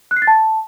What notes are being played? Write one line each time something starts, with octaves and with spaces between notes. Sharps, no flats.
F#6
C7
A6
A5